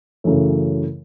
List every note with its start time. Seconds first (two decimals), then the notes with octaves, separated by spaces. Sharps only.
0.24 F#2 C#3 E3 A3